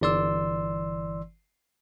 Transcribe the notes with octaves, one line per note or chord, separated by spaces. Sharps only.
G1 E3 D5 C6 E6